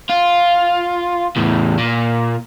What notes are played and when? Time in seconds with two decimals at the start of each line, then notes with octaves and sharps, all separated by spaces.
0.10 F4
1.37 E2 A2
1.78 A#2